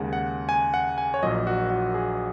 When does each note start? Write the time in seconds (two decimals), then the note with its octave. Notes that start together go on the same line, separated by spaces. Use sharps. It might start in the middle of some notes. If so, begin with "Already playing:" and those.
Already playing: D#2 C#3 G#3 F#5
0.13 F#5
0.49 G#5
0.74 F#5
0.98 G#5
1.14 C#5
1.23 A#1 A#2 F#3 D#5
1.47 F#4
1.70 F#4
1.94 G#4